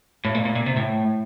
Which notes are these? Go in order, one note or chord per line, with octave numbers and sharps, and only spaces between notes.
A2
A#2
A#2
A#2
C3
A2